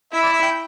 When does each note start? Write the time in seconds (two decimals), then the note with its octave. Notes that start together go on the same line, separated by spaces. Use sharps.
0.13 E4 E5
0.23 D5
0.33 E5
0.43 G5